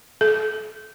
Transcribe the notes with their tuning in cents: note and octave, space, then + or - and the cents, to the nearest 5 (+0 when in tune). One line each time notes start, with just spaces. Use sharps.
A4 -40